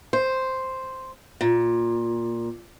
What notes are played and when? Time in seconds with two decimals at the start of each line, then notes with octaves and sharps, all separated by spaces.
0.13 C5
1.41 A#2